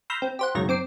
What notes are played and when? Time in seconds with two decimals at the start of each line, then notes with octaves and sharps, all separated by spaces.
0.10 B5 C6 E6 F6 G6 A#6
0.22 C4
0.39 G4 C5 F#5
0.55 C#2 F#2 B2 D#3 C#5 A#6
0.68 F#2 C4 D6 C7